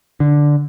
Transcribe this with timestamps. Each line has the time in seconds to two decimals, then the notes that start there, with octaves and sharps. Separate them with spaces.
0.20 D3